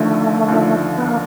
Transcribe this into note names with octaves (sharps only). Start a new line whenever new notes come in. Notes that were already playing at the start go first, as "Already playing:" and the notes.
Already playing: D#2 D3 F3 A3
D#2 D3 F3
B3
A#3